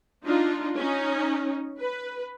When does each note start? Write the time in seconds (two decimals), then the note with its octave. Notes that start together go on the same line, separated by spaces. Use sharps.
0.24 D4 D#4 F4
0.77 C#4 D#4
1.78 B4